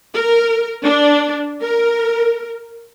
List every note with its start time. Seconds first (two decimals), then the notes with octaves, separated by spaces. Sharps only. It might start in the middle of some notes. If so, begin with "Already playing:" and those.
0.14 A#4
0.84 D4
1.62 A#4